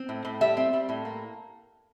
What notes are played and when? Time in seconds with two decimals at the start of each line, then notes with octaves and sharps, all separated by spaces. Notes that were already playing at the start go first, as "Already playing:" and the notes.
Already playing: C4
0.09 A2
0.25 A2
0.41 G3 E5
0.57 C4
0.73 G3
0.89 A2
1.05 A#3